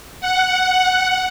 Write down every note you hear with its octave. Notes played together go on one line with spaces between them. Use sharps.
F#5